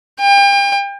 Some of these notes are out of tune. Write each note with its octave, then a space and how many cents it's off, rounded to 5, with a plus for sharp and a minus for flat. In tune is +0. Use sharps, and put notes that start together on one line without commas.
G5 +35